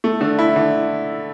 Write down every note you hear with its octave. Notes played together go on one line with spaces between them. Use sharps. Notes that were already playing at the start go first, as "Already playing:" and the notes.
A3
D3
E4
D3